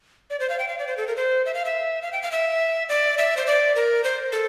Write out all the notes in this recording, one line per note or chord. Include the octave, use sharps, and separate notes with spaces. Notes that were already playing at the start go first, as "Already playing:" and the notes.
D5
C5
F5
G5
F5
D5
C5
A4
A#4
C5
E5
F5
E5
F5
G5
F5
E5
D5
E5
C5
D5
A#4
C5
A4